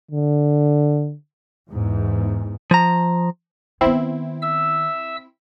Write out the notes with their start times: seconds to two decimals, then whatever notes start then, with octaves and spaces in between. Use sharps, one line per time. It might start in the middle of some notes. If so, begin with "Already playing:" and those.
0.11 D3
1.70 E2 G#2
2.71 F3 A#5
3.81 D#3 B3 C4 E4
4.42 E5 E6